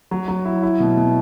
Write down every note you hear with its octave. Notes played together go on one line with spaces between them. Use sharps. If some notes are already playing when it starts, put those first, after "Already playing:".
F#3
F#3
E4
E4
B2
B2